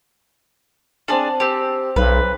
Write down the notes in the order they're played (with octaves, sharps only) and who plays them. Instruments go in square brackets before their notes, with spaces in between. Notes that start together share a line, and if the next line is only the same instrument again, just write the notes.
[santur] C4 A5 [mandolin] D4 G#4 D5
[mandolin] C4 G4 [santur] C5
[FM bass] B1 [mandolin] B4 [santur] F5